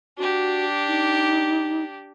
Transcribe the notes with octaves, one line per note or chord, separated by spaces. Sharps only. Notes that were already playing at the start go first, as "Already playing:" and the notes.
D4 F#4 G4
D#4